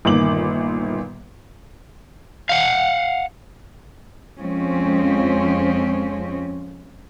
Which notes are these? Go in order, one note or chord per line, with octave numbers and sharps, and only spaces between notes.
G1 A#2 D#3 D6 F#7
F5 F#5
F2 F3 G#3 C4 C#4